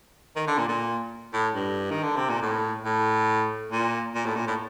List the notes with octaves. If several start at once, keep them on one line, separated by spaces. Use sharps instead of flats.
D#3
D3
A#2
A#2
A2
G2
D#3
D3
C3
A#2
A2
A2
A#2
A#2
A2
A#2
A2